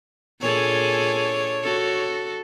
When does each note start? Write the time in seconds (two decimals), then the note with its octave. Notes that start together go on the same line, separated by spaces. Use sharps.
0.41 A#2 D4 G#4 A4 C#5
1.63 F#4 A4